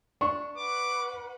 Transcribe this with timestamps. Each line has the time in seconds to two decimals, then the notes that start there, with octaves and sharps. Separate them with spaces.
0.21 D4 C#6
0.57 B4 F#5 D6